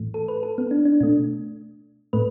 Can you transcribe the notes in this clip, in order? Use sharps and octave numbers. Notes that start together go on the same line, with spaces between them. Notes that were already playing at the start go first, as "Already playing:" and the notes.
Already playing: A2 E3 A3
A4
B4
A4
B3
D4
D4
B2 A3 D4
A2 A3 B4